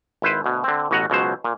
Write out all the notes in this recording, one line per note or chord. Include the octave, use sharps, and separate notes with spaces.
G#1 E4 B4 C5
D2 B2
D3 C4
A1 B2 F#4 D#5 F#5 A#5
C#2 B2 F#3 C5
A#2